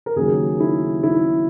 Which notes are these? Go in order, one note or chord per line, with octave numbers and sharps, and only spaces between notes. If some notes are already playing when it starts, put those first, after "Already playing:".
A#4
D#2 C#3 F#3 G#4
E4
E4